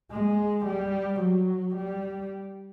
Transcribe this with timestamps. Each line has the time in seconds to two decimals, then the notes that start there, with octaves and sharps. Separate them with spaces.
0.11 G#3
0.66 G3
1.21 F#3
1.76 G3